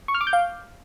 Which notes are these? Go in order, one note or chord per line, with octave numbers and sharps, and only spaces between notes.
C#6
F6
D6
G6
F5